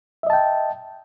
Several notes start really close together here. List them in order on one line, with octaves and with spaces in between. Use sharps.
E5 D#5 A5 G5